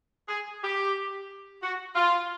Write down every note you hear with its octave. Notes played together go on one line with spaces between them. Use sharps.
G#4
G4
F#4
F4